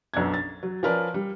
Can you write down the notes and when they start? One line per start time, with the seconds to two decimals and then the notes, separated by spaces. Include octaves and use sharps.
0.14 B1 F#2 B3 D4 G#6
0.34 A6
0.63 F#3
0.83 F3 C#4 A#4 B4 D5
1.14 G3